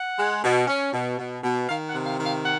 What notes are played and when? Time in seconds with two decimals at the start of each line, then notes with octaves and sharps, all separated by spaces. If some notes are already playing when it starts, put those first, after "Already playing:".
Already playing: F#5
0.18 G#3
0.43 B2
0.67 C#4
0.93 B2
1.18 B2
1.43 B2
1.69 D#3 F5
1.88 F#5
1.94 C3
2.06 F5
2.19 D#3
2.26 F5
2.44 F#5